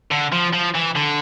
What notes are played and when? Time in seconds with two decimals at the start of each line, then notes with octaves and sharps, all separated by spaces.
0.11 D3
0.32 F3
0.53 F3
0.74 E3
0.95 D3